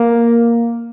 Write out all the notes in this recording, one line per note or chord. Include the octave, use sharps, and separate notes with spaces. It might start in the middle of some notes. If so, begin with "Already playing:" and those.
Already playing: A#3